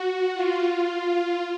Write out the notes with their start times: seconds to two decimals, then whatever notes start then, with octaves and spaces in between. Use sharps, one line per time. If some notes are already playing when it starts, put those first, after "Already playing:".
Already playing: F#4
0.34 F4